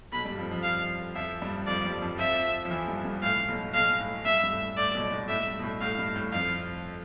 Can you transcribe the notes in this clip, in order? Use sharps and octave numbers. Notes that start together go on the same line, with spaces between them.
B1 B2 B5
G2 G3
F2 F3
F2 F3
F5
F2 F3 E5
G2 G3
F2 F3 D5
G2 G3
F2 F3
F2 F3 E5
F3
E2 E3
G2
G2
A2 F5
B1 B2
B1 B2 F5
A2
G2 E5
G2
A2
A2 D5
B1 B2
B1 B2
A2 E5
G2
B2
A2
A2 F5
G2
A2
F2 F3 F5